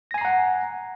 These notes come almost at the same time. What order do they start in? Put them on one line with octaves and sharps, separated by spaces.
A#6 G#5 C7 A#5 F#5